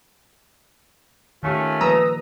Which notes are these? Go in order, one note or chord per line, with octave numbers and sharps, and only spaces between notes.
D#3 A3 C#4 F4 G4
F3 G3 A#3 B4 A#5 D#6 E6